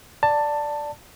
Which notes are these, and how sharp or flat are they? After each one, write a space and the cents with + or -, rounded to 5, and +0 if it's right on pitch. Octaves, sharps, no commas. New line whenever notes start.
D5 +0 A5 +15